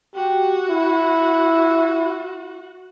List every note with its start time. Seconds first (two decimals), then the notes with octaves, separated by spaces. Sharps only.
0.15 F#4 G4
0.70 E4